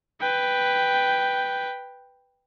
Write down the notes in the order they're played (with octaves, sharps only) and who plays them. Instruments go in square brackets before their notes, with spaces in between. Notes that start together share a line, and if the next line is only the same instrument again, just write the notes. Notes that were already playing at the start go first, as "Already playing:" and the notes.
[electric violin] B4 G5